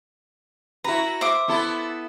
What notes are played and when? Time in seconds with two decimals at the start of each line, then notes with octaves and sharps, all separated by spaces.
0.84 E4 F#4 B4 A#5
1.21 C5 E5 D6
1.48 B3 E4 A4